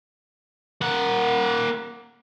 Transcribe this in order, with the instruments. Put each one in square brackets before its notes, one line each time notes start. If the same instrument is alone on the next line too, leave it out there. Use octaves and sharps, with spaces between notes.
[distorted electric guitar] A#3 F#5